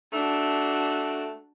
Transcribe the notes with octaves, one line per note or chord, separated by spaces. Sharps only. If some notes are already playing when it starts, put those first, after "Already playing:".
A3 D4 F#4